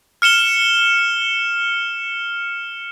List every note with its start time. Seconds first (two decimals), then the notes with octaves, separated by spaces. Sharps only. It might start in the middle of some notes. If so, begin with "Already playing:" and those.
0.22 F6 C#7 E7 G7